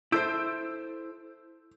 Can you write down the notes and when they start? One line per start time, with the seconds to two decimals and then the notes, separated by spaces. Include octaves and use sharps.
0.12 E4 A4 C5 E6 G6 D7